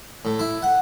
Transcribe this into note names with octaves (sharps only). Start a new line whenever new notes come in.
A2
E4
F#5